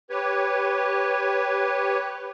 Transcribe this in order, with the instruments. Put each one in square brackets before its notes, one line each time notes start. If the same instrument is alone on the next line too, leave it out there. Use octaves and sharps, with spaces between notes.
[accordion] G4 B4 C#5